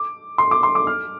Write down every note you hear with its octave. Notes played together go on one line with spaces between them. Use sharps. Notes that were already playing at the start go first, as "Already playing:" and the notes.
Already playing: D6
C6
D6
C6
D6
F6